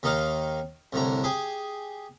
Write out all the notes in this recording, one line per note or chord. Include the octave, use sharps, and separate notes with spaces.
D#2 D#3 D#4 D#5 F5
C2 A2 D3 A#5
G4 G#4 G#5